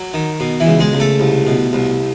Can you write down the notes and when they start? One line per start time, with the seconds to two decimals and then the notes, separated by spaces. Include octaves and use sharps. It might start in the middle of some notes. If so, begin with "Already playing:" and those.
Already playing: F#3 F#4
0.14 D#3
0.40 B2
0.60 E3 E4
0.66 C#2
0.80 G#3 G#4
0.93 C#2
1.00 A3 A4
1.20 C2
1.47 B2
1.73 C2